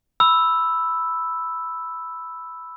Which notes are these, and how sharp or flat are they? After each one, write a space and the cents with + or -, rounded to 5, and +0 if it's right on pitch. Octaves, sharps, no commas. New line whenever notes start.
B5 +0 E6 +0